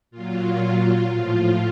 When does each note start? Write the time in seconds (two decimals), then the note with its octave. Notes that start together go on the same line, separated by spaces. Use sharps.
0.11 A#2 F#3 F4
1.09 A2 F3 F4